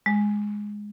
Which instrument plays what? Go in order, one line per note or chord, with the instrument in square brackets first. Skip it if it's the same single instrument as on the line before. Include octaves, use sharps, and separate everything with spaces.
[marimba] G#3